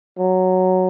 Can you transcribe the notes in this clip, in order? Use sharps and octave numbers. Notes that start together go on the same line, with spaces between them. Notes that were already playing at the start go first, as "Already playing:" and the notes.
F#3